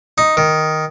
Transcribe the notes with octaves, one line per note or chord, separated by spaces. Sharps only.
D#4
D#3